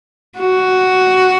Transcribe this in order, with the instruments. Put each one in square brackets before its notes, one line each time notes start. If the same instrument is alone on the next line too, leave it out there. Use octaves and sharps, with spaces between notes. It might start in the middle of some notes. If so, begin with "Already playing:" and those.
[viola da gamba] F#4